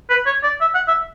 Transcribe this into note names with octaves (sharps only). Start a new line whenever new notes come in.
B4
C#5
D5
E5
F#5
E5